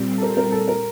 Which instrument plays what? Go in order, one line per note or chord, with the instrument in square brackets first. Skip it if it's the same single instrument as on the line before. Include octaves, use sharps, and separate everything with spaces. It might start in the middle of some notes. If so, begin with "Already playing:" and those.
Already playing: [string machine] A#2 G3 C4
[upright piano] A4
A#4
A#4
A4
A#4